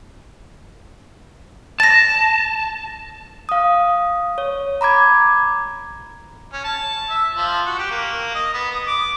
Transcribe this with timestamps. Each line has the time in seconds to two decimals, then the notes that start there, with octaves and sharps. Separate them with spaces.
1.80 A5 A6 A#6
3.49 F5 D#6
4.38 C#5
4.81 A#5 B5 D6 G#6
6.53 C#4
6.65 A5
7.10 E5
7.36 F3
7.66 F#4
7.79 G4
7.91 A#3
8.35 D#5
8.54 B3
8.71 D#6
8.87 D6